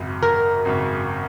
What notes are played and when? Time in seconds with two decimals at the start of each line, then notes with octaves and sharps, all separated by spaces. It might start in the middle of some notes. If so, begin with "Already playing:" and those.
Already playing: G#1 F#2 C#3
0.23 A#4
0.65 G#1 F#2 C#3